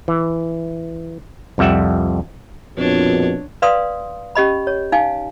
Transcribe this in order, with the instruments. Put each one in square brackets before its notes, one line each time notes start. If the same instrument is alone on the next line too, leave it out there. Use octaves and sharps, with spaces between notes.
[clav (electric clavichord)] E3
C2 F2 G3 E5 F#5
[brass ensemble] A#1 F2 B2 [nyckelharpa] D4 C#5
[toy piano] B4 D5 F5 C6 D#6
C#4 G4 D#5 B5
C#5
D#4 F5 G#5